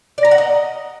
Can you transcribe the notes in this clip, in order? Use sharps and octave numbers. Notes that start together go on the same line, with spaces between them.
D5
A#5
F#5
D#5